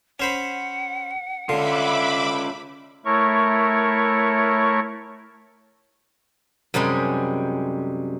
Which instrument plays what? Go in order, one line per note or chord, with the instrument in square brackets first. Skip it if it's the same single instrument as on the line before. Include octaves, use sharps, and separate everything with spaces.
[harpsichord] C#4 C5 B5 [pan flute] F#5
[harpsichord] D3 [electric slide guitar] C#4 F4 [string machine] E5 B5 D6
[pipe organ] A3 E4 A#4 C#5 C#6
[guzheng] F#2 C3 G3 G#3